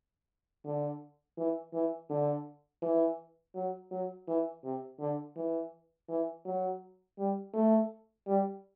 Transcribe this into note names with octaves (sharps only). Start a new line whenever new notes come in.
D3
E3
E3
D3
E3
F#3
F#3
E3
C3
D3
E3
E3
F#3
G3
A3
G3